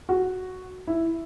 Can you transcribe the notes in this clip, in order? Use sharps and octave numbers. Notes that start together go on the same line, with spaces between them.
F#4
E4